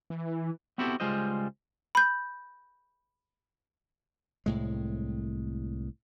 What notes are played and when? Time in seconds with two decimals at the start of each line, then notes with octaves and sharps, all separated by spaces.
0.10 E3
0.78 B3 C4 E4 F#4 G4 A4
1.00 C#2 G3 G#3 F4 C5 D#5
1.95 B5 G6
4.46 C2 A2 G#3